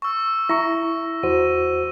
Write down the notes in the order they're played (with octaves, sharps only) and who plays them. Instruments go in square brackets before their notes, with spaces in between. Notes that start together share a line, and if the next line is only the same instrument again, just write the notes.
[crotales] C#6 E6
[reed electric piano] E4 A#5 C#6 [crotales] A#6
[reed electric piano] E2 F#4 C5 [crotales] D#7